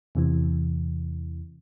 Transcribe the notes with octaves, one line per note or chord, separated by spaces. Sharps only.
E2 C3 E3